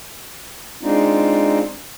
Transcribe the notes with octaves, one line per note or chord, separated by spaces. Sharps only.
G#3 C4 D4 D#4 F4